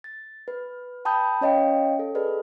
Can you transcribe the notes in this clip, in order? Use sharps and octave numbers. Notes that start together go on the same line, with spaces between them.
A6
B4
G5 A5 B5 D#6 G6
C#4 C#5 D#5 F5 G5
A4
G#4 A4 B4 D5 D#5